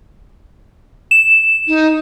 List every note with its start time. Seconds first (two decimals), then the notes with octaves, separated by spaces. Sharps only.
1.11 E7
1.68 D#4